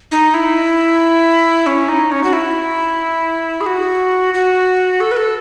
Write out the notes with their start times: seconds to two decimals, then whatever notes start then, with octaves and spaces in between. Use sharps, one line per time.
0.11 D#4
0.34 E4
1.66 C#4
1.88 D#4
2.11 C#4
2.24 F#4
2.33 E4
3.61 G#4
3.66 F#4
4.34 F#4
5.00 A4
5.11 B4
5.16 A4